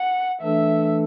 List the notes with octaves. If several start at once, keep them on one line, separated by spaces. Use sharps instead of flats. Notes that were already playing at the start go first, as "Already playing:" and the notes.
Already playing: F#5
E3 A3 D4 A4 E5